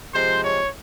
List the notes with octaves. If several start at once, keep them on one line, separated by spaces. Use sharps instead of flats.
C3 F3 G#3 C5
C#5